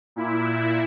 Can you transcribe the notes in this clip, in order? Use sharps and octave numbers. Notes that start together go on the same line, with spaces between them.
A#2 E4